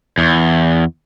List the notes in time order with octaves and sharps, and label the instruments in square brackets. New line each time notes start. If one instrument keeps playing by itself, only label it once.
[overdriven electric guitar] E2